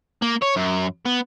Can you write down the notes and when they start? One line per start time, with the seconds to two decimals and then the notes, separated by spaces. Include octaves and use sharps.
0.22 A#3
0.42 C#5
0.57 F#2
1.06 B3